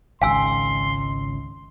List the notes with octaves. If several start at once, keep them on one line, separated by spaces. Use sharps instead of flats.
G#1 C#2 F5 G#5 C6 E6